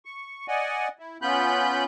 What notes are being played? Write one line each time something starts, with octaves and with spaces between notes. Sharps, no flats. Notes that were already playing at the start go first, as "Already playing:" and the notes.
C#6
D5 D#5 F#5 G#5
E4
B3 C#4 F4 B5 F#6 G6